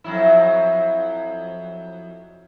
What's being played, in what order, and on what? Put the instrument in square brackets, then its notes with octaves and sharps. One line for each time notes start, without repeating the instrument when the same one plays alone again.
[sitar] F2 F#3 E4